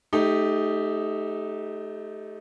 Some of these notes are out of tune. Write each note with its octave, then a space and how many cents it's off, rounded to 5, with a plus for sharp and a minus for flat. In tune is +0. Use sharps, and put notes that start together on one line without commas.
A3 -25 D#4 +0 G4 +0